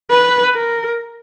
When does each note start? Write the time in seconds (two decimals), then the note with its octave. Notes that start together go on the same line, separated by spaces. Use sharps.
0.10 B4
0.55 A#4